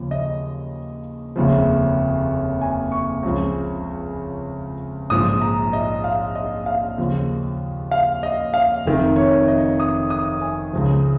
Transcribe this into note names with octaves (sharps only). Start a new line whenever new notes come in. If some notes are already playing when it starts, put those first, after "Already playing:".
Already playing: D#2 C#3 F3
D#5
F1 D#2 C#3 F3
G#5
C#6
C#2 C#3 F3
A#1 G#2 F3 D#6
A#5
D#5
F5
D#5
F5
D#2 C#3 F3
F5
D#5
F5
F1 F2 D#3
C#5
D#5
D#6
D#6
G#5
C#2 C#3 F3